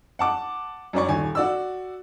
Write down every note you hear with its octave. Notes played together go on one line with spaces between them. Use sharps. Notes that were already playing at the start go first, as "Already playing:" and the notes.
F#5 A5 D6
F#2 C#4 D5 C#6
D#1 G#5
F#4 D5 E6